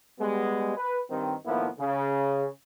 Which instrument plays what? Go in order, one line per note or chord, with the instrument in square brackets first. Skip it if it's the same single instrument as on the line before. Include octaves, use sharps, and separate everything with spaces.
[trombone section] G3 G#3 B3
B4
G2 D#3 C4
A2 D#3 F3 A#3 B3 E4
C#3